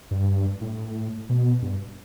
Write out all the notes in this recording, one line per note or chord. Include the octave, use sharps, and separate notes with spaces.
G2
A2
B2
G2